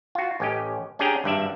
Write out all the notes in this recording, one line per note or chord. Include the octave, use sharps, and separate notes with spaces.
F4 F#4
A1 C#4 G4 D#5
C#4 D4 G4 G#4 G5 A#5
G#1 G2 D5 E5